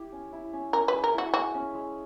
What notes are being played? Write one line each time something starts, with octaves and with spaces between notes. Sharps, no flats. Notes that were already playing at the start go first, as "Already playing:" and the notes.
Already playing: E4 G4
C#4
E4
C#4
C#4 A#4
B4
G#3
A#4
E4 F#4
F#4 G#4
C#4
G#3